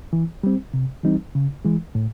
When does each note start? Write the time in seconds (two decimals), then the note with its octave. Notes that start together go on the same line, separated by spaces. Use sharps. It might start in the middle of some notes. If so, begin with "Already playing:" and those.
0.13 E3
0.43 G3 C4
0.74 C3
1.04 E3 G3 C4 D#4
1.35 C#3
1.65 E3 G#3
1.95 A2